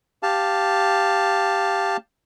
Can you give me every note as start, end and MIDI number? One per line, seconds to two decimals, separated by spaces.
0.23 1.97 67
0.23 1.97 77
0.23 1.97 81